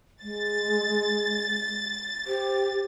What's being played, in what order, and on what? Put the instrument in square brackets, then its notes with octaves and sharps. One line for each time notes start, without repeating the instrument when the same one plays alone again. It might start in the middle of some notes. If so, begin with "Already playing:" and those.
[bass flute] G#3 [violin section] A6
[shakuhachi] G4 [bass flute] C5